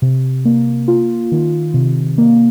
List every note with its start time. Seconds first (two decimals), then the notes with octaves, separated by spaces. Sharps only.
0.02 C3
0.45 A#3
0.88 F4
1.32 D#3
1.74 C3
2.18 A#3